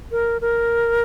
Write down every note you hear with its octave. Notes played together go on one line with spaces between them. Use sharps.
A#4
A#4